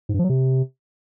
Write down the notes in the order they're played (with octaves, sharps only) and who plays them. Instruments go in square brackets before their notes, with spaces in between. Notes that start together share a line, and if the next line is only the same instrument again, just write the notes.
[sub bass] G#2
G2
F3
F#3
C3